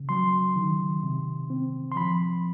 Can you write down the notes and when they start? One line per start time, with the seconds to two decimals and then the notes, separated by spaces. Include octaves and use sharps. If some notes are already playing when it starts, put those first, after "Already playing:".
Already playing: C#3
0.09 F#3 C6
0.56 D#3
1.03 C3
1.50 C4
1.92 C6
1.96 F3 B5